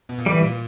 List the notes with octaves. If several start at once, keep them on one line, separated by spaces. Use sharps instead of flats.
B2
A#2
A2 E3 G3
A#2